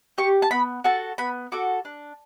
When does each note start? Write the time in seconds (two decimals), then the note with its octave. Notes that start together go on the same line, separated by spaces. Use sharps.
0.18 G4 C#6
0.42 A5
0.51 B3 B5
0.84 F#4 A4 A5
1.18 B3 B5
1.52 F#4 A4 D6
1.85 D4